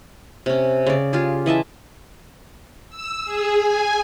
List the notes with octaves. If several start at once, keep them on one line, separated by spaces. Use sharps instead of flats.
C3 C#4
C#3 D5
F4 G4 G#4
E3 D#5 E5 A5
E6
G#4
G#5